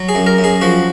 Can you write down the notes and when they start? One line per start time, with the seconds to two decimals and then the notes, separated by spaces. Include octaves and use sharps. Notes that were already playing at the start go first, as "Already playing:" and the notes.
Already playing: F#3
0.09 G#4
0.15 F#2
0.27 A#4
0.39 F#2
0.44 G#4
0.62 F3 F#4